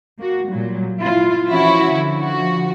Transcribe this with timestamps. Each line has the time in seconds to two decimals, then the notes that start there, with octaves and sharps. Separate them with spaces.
0.18 A#3 F#4
0.49 A#2 F#3 G3
1.00 E4 F4
1.48 E3 F3 C#4 E4 F#4
1.91 D3
2.20 F3 F#4